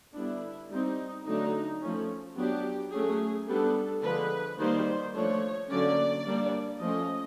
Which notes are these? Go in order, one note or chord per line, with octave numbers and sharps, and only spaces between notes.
D3 G3 B3 D4 E4
G3 C4 D#4
D3 F#3 A3 D4 D#4
F3 A3 C#4
F#3 B3 D4 G4
F#3 A3 C#4 G#4
G3 B3 D4 A4
D3 F3 G#3 B4
D#3 G3 A#3 C5
F3 A3 D4 C#5
D3 F#3 A#3 C#4 D5
G3 A#3 D4
F3 A3 C#4 D#5